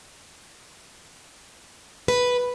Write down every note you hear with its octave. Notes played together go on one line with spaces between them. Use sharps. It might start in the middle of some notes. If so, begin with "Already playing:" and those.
B4